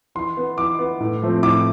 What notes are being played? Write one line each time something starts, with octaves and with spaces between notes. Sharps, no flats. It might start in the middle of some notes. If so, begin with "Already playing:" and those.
E3 C6
B3
E3 D6
B3
A2
F3 A3 C4
A2 D6